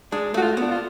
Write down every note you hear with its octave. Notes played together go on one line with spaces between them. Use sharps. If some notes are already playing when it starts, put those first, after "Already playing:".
G#3 D4
A3 F#4
F4
B3 D4
F4